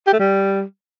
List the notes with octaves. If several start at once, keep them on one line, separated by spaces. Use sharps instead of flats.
G4
A3
G3